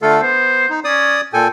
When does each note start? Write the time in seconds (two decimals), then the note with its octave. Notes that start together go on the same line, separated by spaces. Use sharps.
0.02 D3 A3 F4 A4
0.21 B3 C5
0.70 D#4
0.84 C#4 D5 D#6
1.33 A#2 A4 G5 G#5